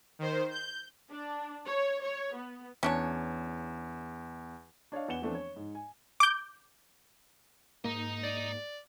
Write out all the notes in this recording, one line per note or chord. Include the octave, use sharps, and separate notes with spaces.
D#3 C5
G6
D4
C#5
C#5
B3
E2 C#4 D4 C#5
D4 C#5 D#5 F5
E2 B3 F#5 C#7 E7 G7
E3 F3 A3 B3 C4 D4
C#5
G#2
G#5
D6 G6
G#2 A#3 D#5 A#5
D5